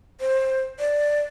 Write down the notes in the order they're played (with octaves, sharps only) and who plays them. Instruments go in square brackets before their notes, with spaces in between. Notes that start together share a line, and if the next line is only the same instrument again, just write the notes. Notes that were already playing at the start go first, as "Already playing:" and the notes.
[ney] C5
D5